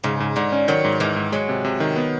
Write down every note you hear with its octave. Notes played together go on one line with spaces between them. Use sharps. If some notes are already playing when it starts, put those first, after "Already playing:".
G#2 C#3
G#2
G#2 D3
C#4
D#3 F#3
G#2
G#2 E3
G#2
F#3 G#3
C3
C3
D#3
B3